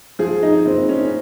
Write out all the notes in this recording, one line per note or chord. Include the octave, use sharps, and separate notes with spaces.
F3 G#4
D#4
F#1 C4
C#4